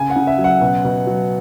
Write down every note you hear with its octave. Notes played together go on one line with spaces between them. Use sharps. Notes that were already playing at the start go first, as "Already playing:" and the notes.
Already playing: C#3 G#5
F#5
C#3
E5
F#3
F#5
B2
B2
F#3